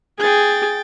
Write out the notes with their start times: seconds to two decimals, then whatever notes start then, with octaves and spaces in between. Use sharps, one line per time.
0.19 G#4 G5 A6